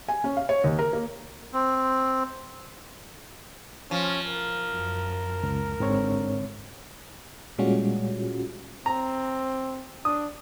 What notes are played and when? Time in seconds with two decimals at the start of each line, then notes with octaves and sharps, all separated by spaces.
0.08 G#5
0.24 C#4
0.37 F5
0.49 C#5
0.64 D#2
0.79 A#4
0.93 A#3
1.53 C4
3.91 F3 C#4
4.26 A#4
4.69 F#2
5.43 C#2
5.80 G#1 G#2 D3 C4 C#5
7.58 A#2 G3 G#3 C#4 F4 F#4
8.86 C4 A#5
10.05 D4 D#6